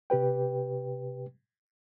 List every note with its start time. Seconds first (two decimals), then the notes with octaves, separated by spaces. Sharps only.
0.10 C3 G4 B4 G5